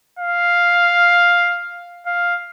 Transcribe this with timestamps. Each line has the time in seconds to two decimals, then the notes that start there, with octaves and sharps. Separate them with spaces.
0.19 F5
2.06 F5